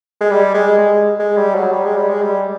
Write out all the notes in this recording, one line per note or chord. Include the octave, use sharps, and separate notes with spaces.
G#3
G3
G#3
G#3
G#3
G3
F#3
G3
G#3
G3
G#3
G3